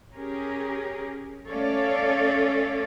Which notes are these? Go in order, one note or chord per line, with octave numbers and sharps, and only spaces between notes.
C#4 G4 G#4 A#4
A3 C#4 A4 C#5 D5 F5